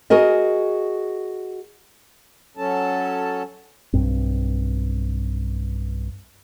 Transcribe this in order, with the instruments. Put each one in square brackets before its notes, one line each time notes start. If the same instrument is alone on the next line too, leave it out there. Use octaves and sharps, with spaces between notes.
[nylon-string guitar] F#4 G#4 A#4 D#5
[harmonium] F#3 C#4 A4 A5
[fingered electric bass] B1 G2 C4